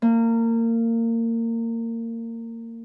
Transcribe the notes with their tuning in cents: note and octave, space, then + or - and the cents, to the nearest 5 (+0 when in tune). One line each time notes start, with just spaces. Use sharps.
A#3 -25